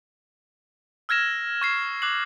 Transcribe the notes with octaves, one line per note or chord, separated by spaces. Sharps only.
E6 F6 G#6 A#6 E7
C#6 G#6 C7
D6 F#6 C7 F#7